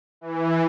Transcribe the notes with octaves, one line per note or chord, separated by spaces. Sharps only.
E3